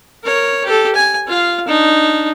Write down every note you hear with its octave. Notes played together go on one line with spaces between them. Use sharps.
A#4 C#5
G4 A4
G#5
F4 F5
D4 D#4